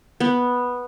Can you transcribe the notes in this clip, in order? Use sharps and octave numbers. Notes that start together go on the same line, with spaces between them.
B3